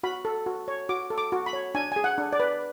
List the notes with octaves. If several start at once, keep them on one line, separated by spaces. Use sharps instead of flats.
F#4 B5
A4
F#4
C#5
F#4 D6
A4
D6
F#4
B5
C#5
D4 G#5
G#4 G#5
F#5
D4
D5
B4